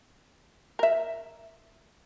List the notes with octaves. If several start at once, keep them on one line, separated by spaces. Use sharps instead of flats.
A#4 E5